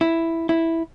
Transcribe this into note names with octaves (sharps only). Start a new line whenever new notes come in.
E4
E4